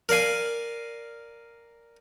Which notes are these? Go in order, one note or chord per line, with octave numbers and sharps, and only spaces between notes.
A#4 D5 F5 G#5